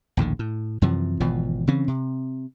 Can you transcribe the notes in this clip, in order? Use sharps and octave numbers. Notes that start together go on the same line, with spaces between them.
A#1 D#2 A2 D3
A2
F#2 C3 E3 F3
G#1 B2 E3 F3
C#3 E3 C4 C#4
C3